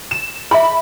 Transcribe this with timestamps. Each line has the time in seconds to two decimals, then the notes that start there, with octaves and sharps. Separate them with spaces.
0.11 E7
0.51 G#4 E5 B5